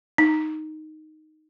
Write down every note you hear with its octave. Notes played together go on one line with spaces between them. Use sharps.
D#4